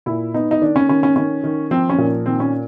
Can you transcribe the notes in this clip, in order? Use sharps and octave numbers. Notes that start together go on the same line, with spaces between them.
A#2 E4
B3 D#4
D#4
D#3 D4
C#4
D#3 C#4
C#4
D#3 C#4
D#3
F3 C4
C#4
A#2
D#3 C4
C#4